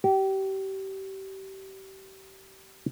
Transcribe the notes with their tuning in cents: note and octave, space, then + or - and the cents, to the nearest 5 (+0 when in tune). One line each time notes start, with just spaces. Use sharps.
G4 -30